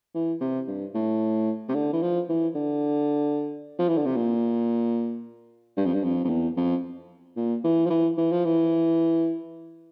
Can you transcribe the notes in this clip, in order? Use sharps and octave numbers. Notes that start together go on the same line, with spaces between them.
E3
C3
G2
A2
C3
D3
E3
F3
E3
D3
F3
E3
D3
C3
A#2
G2
F2
G2
F2
F2
E2
F2
A#2
E3
F3
E3
E3
F3
E3